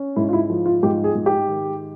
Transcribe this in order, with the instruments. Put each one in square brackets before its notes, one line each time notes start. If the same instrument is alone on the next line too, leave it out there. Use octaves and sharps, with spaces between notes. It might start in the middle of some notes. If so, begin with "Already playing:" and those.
Already playing: [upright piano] C#4
[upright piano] G#2 [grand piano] E4
[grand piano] F4
E4
[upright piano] F3
[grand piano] F4
[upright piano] G#2 [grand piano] G4
[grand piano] G#4
[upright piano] G#2
[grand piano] G4
[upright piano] D#3